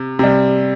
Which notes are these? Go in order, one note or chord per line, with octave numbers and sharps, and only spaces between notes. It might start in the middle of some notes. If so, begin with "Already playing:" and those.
Already playing: C3
C3 G3